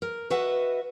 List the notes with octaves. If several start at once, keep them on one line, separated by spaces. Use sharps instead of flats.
A#4
F#4 B4 D#5 E5 F#5